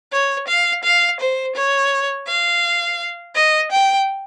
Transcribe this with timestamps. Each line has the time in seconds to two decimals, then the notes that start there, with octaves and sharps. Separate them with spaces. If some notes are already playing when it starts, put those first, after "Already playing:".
0.12 C#5
0.48 F5
0.84 F5
1.20 C5
1.56 C#5
2.27 F5
3.36 D#5
3.72 G5